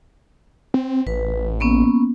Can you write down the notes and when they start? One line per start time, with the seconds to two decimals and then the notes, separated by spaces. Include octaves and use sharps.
0.74 C4
1.07 A1 B4
1.60 A#3 B3 C#4